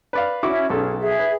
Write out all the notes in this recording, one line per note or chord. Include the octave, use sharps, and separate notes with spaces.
B4 D5 F5
C#4 E4 F#4 E5 D6
B1 C#4 G#4 A4
G#4 E5
B4